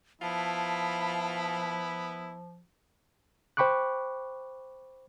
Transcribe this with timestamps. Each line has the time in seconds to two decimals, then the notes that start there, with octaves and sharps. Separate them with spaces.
0.22 F3 B3 E4 F4 A5
3.57 C5 G5 B5 C#6 D6 F#6